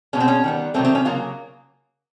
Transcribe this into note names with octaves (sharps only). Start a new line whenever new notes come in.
B2 G#3 B3 C#4
C4
C#4
D#3 G3 B3
C3 D#3 F#3 A3 C4
C4
C#4
C#3 F#3 A#3 F4